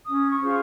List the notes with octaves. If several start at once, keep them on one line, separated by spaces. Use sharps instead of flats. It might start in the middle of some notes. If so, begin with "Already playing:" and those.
C#4 D#6
C#6
F4 G#4 C5